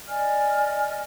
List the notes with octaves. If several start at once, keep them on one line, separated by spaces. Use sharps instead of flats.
D5 D#5 G#5 F6